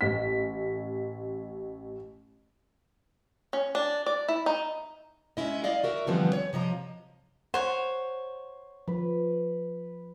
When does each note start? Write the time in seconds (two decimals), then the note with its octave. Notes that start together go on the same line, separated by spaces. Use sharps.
0.01 A1 B6
3.53 C#4
3.75 D4
4.06 D5
4.28 E4
4.46 D#4
5.37 G#3 C#4 E4 D#5
5.64 E4 D5 D#5 F5
5.84 F#4 A#4 E5
6.07 D3 E3 F3 G3 B3 C4
6.33 C#5
6.53 C3 F3 D#5 A#5
7.54 C5 C#5 F#5
8.88 F3 B4